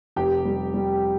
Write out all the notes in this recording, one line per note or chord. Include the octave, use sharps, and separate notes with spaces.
F1 G4 G5
G3
G3